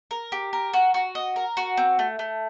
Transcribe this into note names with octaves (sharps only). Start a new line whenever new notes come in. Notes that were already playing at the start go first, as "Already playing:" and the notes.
A#4
G4
A#4
F#4
F#4
D#5
A#4
F#4
C4
A3
A3